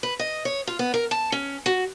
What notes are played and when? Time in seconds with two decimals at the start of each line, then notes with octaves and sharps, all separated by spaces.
0.03 B4
0.19 D#5
0.45 C#5
0.67 F4
0.79 B3
0.94 A#4
1.11 A5
1.32 C#4
1.66 F#4